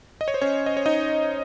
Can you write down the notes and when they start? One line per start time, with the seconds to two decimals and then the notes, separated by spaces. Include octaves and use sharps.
0.21 D#5
0.28 C#5
0.34 C5
0.41 C#4 C#5
0.66 D#5
0.77 C#5
0.86 D#4 D#5